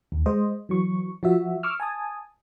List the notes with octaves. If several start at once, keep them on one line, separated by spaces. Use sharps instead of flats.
D#2
G#3 C5 D#5
E3 F#3 C#6
F3 F#4 E5
C#6 D6 E6 F6
G#5 A5 D#6